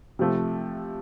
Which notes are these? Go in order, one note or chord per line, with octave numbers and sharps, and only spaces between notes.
C3 F3 A3